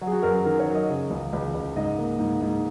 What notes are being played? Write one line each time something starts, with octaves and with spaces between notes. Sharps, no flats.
F#3
G#4
F#4
F#2 A#4
A#4
D#3 A#4
C#5
F#3
D#5
C#3
C#2
C#2
C#2
G#2 D#5
A#3
G#2
G#2